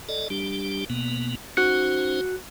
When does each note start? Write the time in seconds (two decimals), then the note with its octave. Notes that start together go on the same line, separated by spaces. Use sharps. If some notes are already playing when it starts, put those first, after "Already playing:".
0.09 A4 D5 D#5
0.30 G3 D4 G4
0.90 B2 A#3 B3
1.57 C#4 D#4 F#4 C5 F#6 C#7